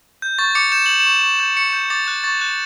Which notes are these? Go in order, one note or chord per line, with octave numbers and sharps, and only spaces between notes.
G6
C#6 A6
D6 C#7
G6 E7
G6 F#7
E7
C#6
C#6 E7
G6
C#6 C#7
G6
D6 A6
F#6
C#6 A6
F#6